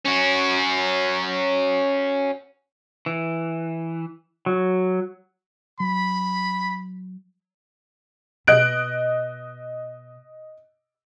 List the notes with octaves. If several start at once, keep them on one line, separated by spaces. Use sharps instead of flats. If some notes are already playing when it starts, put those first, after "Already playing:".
C#4 F#4
E3
F#3
F#3 B5
B2 D#5 F#6 D7